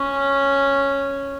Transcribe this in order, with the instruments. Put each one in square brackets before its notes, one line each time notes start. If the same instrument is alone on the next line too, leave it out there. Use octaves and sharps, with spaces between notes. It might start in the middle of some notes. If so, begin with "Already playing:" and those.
Already playing: [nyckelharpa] C#4